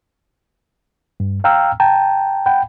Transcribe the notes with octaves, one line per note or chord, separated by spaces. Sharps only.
G2
F5 G5 A#5 E6 F6
G5 A5 A#5
F#5 G5 B5